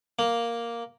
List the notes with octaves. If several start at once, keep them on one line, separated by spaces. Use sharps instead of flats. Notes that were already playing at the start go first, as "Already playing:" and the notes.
A#3